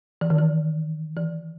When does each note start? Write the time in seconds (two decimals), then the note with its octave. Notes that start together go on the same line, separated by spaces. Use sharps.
0.21 E3
0.30 D#3
0.39 E3
1.16 E3